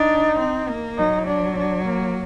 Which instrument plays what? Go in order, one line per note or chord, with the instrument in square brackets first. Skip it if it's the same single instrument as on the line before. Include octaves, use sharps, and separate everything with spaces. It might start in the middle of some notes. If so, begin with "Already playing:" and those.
Already playing: [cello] D4 [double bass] D#4
[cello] C4
A#3
[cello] F#3 [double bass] D#4
[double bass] D4
D4
A#3